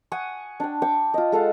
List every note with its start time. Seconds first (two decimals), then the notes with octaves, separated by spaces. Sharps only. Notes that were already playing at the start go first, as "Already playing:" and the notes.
0.12 F#5 G#5 C#6 D#6
0.60 D4 G5
0.82 G5 C#6 D6
1.14 F4 D#5
1.32 G#3 A4 F5 F#5